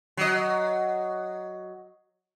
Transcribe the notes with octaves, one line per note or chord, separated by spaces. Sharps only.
F#3 D#5